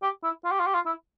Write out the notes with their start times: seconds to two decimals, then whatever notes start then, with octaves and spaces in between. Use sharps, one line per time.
0.02 G4
0.23 E4
0.45 F4
0.51 G4
0.60 F4
0.67 G4
0.74 F4
0.86 E4